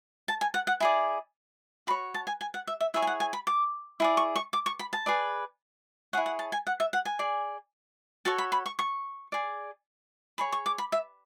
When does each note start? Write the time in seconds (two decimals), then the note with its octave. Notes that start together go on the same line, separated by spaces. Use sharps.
0.28 A5
0.41 G#5
0.54 F#5
0.67 F#5
0.80 E4 G#4 D5 G#5
1.87 F#4 B5
1.90 C#5
2.14 A5
2.27 G#5
2.41 G#5
2.54 F#5
2.67 E5
2.81 E5
2.94 E4 G#4 C#5 E5
3.02 G#5
3.07 F#5
3.20 G#5
3.33 B5
3.47 D6
4.00 E4 G#4 D5
4.17 C#6
4.36 C#6
4.53 D6
4.66 C#6
4.79 B5
4.93 A5
5.06 G#4 B4 D5
6.13 E4 G#4 C#5 F#5
6.26 F#5
6.39 A5
6.52 G#5
6.67 F#5
6.80 E5
6.93 F#5
7.05 G#5
7.19 G#4 D5
8.25 F#4 A4 C#5 A5
8.38 B5
8.52 B5
8.66 C#6
8.79 C#6
9.32 G#4 D5
10.38 G#4 C#5 B5
10.52 C#6
10.66 D6
10.78 B5
10.92 E5